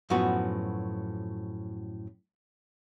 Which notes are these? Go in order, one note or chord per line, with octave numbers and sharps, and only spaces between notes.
F#2 A2 F3 B3 F#4